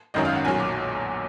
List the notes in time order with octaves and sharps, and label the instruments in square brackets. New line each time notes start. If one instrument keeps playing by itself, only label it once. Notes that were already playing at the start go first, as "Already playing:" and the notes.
[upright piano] G#1 F#2 D#3 F#3 D#5
F5
F#5
B1 A#2 F#3 G#5
D6